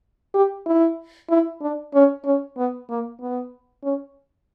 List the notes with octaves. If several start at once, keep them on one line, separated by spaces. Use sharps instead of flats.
G4
E4
E4
D4
C#4
C#4
B3
A#3
B3
C#4